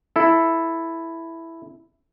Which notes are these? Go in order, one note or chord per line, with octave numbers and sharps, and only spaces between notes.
E4 A4